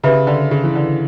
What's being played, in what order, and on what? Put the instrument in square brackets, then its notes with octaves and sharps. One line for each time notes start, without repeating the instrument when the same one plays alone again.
[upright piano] C#3 [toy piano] G4 B4 E5 B5
[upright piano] D3
C#3
E3
D3